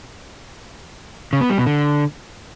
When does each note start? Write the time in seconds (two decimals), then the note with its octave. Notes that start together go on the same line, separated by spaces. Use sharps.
1.33 C#3
1.41 B3
1.50 G3
1.58 B2
1.66 D3